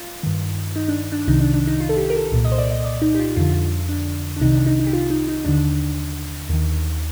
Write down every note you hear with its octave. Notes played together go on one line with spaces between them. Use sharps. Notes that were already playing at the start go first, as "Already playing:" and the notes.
Already playing: F4
G2 D#3
D#4
D4
D4
C2 C3 D#3 D#4
D4
D4
D#4
F4
A4
G4
A#4
A4
C2 A#2
D#5
C5
D5
D#5
D5
D#4
G4
F4
F2 D3 F4
F4
D4
D4
C2 C3 D#3 D#4
D4
D#4
D#4
G4
F4
D#4
D#4
D#2 D3 D4
D#2 D#3